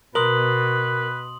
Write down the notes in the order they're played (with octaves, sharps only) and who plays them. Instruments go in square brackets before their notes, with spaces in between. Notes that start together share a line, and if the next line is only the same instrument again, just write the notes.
[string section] B2 [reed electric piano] A#4 [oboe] B4 [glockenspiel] C6 D#6 F#7